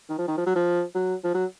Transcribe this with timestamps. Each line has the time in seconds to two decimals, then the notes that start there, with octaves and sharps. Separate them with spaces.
0.09 D#3
0.18 F3
0.28 D#3
0.37 F3
0.46 F#3
0.55 F3
0.95 F#3
1.24 F3
1.34 F#3